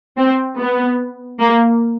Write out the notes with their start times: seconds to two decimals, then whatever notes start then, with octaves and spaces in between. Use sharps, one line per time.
0.17 C4
0.58 B3
1.40 A#3